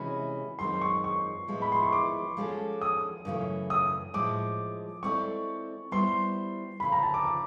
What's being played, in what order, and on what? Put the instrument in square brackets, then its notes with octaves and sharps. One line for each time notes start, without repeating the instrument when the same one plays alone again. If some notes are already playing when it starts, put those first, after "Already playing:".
Already playing: [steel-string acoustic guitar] C3 E3 G#3 C#4 F#4 [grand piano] B5
[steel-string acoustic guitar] F#2 D#3 G#3 C4 [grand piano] C6
[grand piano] C#6
C#6
[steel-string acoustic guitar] A2 F3 G#3 B3 E4
[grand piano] B5
C6
C#6
D6
[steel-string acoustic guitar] F3 G#3 C#4 F#4 A4
[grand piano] D#6
[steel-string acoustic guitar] F#2 C#3 E3 A3
[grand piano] D#6
[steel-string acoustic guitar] A2 F3 G#3 [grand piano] D6
[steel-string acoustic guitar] G#3 C4 E4 A4 D5 [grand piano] C#6
[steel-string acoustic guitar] G3 B3 E4 G4 C5 [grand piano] C6
[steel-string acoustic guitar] D2 C#3 F3 [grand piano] B5
[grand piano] A#5
A5
D6
D6